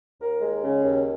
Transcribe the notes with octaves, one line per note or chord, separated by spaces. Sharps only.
D#2 A#4
G#3
C#3
D#2